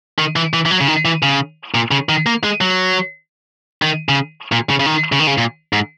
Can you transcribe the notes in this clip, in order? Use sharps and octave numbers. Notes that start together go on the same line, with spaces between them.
D#3
E3
E3
E3
F#3
C#3
D#3
E3
C#3
A#2
C#3
D#3
A#3
G#3
F#3
D#3
C#3
A#2
C#3
C#3
D#3
C#3
D#3
C#3
A#2
G#2